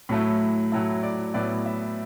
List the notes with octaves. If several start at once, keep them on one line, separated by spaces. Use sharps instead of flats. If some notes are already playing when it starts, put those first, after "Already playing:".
A2 F#3 A3 E4
A2 F#3 A3 E4
D5
A2 F#3 B3 E4 D5
E5